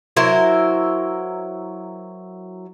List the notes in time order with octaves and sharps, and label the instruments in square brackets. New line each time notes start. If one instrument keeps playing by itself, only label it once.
[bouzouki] F#3 E4 A#4 C5